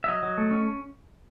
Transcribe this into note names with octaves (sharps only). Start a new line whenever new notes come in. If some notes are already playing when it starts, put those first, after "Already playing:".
E5
F#3 D#5
F#3
A3
C#4